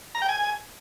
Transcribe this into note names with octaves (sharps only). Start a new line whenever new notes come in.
A#5
G5
G#5